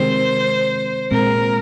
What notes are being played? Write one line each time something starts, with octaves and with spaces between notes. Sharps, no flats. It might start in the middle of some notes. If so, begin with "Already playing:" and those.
Already playing: C3 D#3 G#3 C4 C5
A#2 G#3 C4 A#4